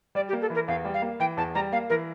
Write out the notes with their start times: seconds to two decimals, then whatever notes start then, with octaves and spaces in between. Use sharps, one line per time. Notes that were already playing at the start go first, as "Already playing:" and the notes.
0.15 G3 D5
0.29 G4
0.33 A#3
0.41 A4
0.50 E3
0.55 A#4
0.68 E2 F5
0.85 G3
0.94 F5
1.02 A#3
1.20 E3 G5
1.37 E2 A5
1.55 G3 A#5
1.72 A#3 F5
1.90 E3 A#4